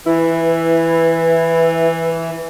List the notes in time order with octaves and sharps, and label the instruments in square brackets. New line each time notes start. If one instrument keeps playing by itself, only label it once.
[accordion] E3 [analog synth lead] E4 [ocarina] B4